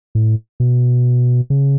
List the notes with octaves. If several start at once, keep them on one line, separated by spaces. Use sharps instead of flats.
A2
B2
C#3